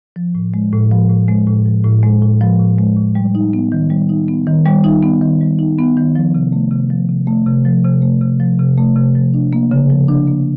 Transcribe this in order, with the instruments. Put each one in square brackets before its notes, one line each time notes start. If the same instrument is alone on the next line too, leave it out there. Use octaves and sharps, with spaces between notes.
[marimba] F3
A2
G#3
A2
F3
A2
G#3
A2
F3
A2
G#3
A2
F3
A2
G#3
A2
G3
D#4
B3
D#3
G3
D#4
B3
D#3
G3
D#4
B3
D#3
G3
D#4
B3
D#3
F3
C3
A3
C3
F3
C3
A3
C3
F3
C3
A3
C3
F3
C3
A3
C3
F3
D4
A#3
C#3
F3
D4
A#3